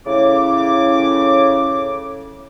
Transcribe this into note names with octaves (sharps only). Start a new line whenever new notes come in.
A2 C#3 D6